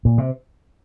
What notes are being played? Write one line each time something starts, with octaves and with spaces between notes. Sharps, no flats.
A#2
C3